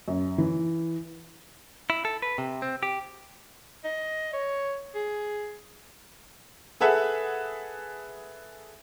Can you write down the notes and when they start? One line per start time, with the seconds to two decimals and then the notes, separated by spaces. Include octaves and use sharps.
0.08 F#2
0.38 E3
1.90 E4
2.05 A4
2.22 B4
2.38 C3
2.62 C4
2.83 G4
3.84 D#5
4.33 C#5
4.95 G#4
6.80 G#4 A4 B4 E5 F#5